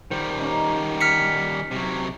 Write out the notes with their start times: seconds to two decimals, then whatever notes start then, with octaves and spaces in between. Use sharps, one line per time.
0.11 D#3 G3 C5
0.39 C#4 D#4
1.01 F6 B6 C#7
1.71 C3 F#3